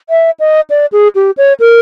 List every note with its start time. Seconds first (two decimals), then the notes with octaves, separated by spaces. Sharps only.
0.09 E5
0.40 D#5
0.70 D5
0.92 G#4
1.15 G4
1.37 C#5
1.60 A#4